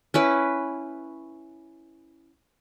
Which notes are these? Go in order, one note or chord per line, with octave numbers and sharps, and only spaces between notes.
C#4 E4 B4